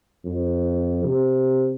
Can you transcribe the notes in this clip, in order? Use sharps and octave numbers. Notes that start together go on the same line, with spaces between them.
F2
C3